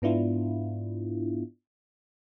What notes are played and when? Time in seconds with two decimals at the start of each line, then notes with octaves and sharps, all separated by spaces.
0.02 G#2 B3 D4 E4 F4